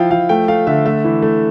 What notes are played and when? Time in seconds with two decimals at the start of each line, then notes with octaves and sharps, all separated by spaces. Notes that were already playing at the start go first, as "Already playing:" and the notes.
Already playing: F3 E4 F5 G5
0.11 F3 F5
0.29 A3 G5
0.48 A3 F5
0.67 D3 E5
0.86 A3 E5
1.04 E3
1.22 A3